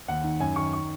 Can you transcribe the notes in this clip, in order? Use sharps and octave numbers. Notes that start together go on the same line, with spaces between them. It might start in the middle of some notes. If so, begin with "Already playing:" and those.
D#2 F#5
D#3
F#2 G#5
D#3 C#6
C#6